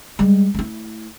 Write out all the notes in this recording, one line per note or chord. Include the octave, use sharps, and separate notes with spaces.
G3 G#3
A3 E4